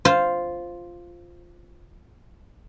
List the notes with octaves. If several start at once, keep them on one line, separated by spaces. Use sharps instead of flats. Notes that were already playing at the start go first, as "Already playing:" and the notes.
F4 C5